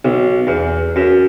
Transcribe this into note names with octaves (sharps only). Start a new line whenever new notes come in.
B1
E2
F#2